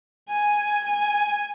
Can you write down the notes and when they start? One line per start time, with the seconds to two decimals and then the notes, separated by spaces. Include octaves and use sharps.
0.29 G#5
0.85 G#5